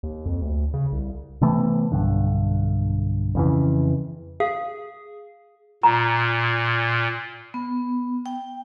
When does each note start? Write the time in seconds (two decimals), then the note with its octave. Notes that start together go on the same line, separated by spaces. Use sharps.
0.03 D#2
0.26 F2
0.42 D2
0.74 C#3
0.92 C2
1.41 C3 E3 A3 B3
1.92 B1 G2 D3
3.35 F2 C#3 E3
4.40 G#4 F5
5.83 A#2 A#5
7.54 B3
8.26 G5